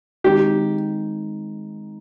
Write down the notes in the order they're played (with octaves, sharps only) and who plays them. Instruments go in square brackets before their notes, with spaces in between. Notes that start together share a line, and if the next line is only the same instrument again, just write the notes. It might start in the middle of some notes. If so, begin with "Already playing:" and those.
[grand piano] D#3 G#3 C4 D#4 [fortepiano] G4